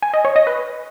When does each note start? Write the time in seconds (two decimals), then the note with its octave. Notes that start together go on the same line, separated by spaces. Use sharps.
0.02 G#5
0.14 D#5
0.25 C#5
0.36 D#5
0.47 B4